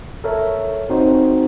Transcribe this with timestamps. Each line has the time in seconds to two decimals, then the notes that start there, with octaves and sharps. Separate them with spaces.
0.24 A4 A#4 C#5 E5
0.90 C4 D#4 F#4 C5